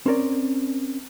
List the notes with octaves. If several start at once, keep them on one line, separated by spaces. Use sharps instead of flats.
C4 C#4 A#4 D5